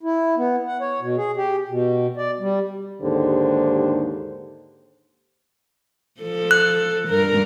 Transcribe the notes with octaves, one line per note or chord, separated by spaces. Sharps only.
E4
B3
F#5
C#5
B2
G#4
G4
B2
D5
G3
D#2 G#2 D3 G4 C5
F3 A4
F#6
G2 A#4